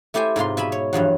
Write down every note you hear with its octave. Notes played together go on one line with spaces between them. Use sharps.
A3 E4 G4 C5 G#5
G#2 C3 F4 C6
B2 E5 G#5 B5
C#5
E2 G2 F3 F#3